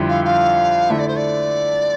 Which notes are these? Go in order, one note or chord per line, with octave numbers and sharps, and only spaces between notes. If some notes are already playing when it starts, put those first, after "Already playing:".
Already playing: F2 D3 G3 C4 E4
F5
F5
D3 A3 E4 E5
D5
C5
D5